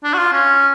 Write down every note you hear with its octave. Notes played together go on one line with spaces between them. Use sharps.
D4
F#4
F4
C#4